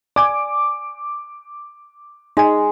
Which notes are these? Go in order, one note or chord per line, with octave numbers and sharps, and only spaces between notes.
D5 G#5 D6
G#3 D#4 G#5